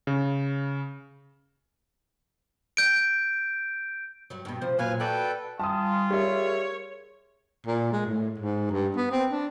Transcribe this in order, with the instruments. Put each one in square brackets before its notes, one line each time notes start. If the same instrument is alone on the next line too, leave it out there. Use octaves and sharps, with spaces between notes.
[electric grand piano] C#3
[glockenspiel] G6 D7
[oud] G2 F#3
G2 B2
C3 F3 C5
[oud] F#2 A#2 F#3 [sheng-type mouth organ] B4 F5 G#5
[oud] F#4 D5 [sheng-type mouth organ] A4 B4 G5
[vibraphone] G3 G#5 [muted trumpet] F4 [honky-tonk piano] A5 D#6
[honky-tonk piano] G3 E5 [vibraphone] G#4 A#4 [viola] C#5
[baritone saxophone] A#2
G#3
A2
G#2
G2
B3
C4
D4